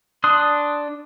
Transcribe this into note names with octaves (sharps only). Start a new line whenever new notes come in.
D4 C6 D#6 F#6